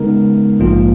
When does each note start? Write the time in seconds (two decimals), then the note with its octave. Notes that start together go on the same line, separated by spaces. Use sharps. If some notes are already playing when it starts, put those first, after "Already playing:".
Already playing: C#3 G#3 B3 D#4 A#4
0.60 A#1 G#2 F3 A#3 F4